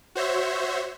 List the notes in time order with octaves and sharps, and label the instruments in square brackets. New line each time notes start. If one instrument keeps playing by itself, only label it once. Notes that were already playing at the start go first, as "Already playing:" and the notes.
[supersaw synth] F#4 C5 C#5 E5